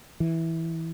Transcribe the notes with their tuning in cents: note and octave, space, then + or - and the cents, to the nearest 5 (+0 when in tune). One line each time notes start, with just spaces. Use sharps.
E3 -10